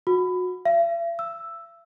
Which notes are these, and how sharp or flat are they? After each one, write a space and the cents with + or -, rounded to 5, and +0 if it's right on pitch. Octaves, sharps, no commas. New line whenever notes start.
F#4 -25
E5 +45
E6 +0